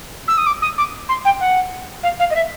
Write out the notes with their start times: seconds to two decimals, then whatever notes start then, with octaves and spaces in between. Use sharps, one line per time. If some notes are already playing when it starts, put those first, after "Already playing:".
0.28 E6
0.38 D#6
0.47 D6
0.62 D#6
0.78 D6
1.09 C6
1.25 G5
1.41 F#5
2.03 F5
2.20 F5
2.31 D#5
2.35 E5